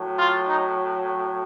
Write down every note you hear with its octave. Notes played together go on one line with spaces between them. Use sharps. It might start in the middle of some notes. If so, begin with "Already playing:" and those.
Already playing: A2 F#3
F4
D#4